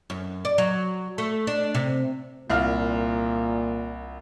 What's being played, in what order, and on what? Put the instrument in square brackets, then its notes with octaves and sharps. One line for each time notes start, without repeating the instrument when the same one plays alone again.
[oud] F#2
D5
F#3
A3
D4
C3
[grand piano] C2 F5 F6 [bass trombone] A#2